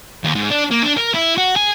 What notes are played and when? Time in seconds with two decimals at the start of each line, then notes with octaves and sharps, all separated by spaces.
0.24 D#2
0.35 G#2
0.51 D4
0.71 A#3
0.83 D4
0.97 A#4
1.14 E4
1.38 F#4
1.56 G#4